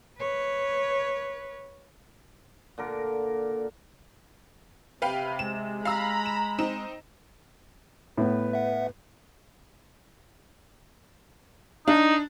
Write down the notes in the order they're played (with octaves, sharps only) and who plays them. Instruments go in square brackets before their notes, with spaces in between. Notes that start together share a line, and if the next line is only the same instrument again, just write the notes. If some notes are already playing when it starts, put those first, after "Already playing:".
[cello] B4 C#5
[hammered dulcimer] A#2 D3 A#4
[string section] C3 [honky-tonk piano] B4 F5 G5
[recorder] G#3 [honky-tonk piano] E7
[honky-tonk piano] F5 E6 [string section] A#5 B5
[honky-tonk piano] E7
C4 D#4 E7
[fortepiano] A2 B3 [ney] B4
[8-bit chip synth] E5 F#5
[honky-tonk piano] D4 [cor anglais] D#4